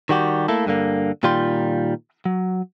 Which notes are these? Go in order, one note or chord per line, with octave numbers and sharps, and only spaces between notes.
D#3 G3 F#4 G4
A3 A#3 E4 A4
G2 D3 A#3
A#2 D#3 G3 F4 G5 C6
F#3